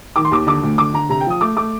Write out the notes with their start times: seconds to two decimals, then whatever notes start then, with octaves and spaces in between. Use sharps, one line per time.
0.16 D#3 D6
0.25 C6
0.31 D#2 D6
0.47 D3 D6
0.63 D2
0.78 D3 D6
0.94 D3 A#5
1.09 C3 A#5
1.20 G5
1.26 F3 D#6
1.41 A3 D6
1.56 A3 D6